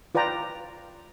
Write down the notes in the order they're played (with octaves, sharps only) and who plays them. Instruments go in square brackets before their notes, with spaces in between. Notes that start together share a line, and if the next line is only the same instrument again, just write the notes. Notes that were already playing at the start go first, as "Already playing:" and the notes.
[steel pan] F4 B4 D5 G5 A#5